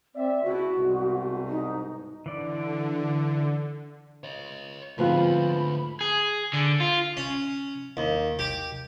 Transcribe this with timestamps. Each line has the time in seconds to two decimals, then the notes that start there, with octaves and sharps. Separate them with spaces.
0.15 C4 D5 E5
0.44 C#2 B2 E4 F#4
0.78 C2 G#2 B2
1.48 D#4
2.26 D3 E3 D5
4.24 C#5 D#5
4.98 D2 G#2 F3 B3 C4 F4 B5
6.01 G#4
6.53 D3
6.80 F4
7.17 C#4
7.97 D#2
8.39 G4 D6